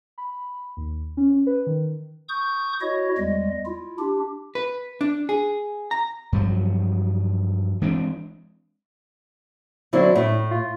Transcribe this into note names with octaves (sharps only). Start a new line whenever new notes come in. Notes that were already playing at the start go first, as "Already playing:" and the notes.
B5
D#2
C#4
C#4
B4
D#3
C#6 D#6 G6
E4 F#4 C#5 D#5
E2 G3 G#3 D#5
E4 F4
D4 G4
B4
D4
G#4
A#5
G2 F3 F#3
E3 G#3 C4 D4
D3 F#3 C4 E4
A2
F4